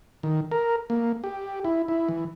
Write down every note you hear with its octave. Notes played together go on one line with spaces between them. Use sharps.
D#3
A#4
A#3
G4
E4
E4
E3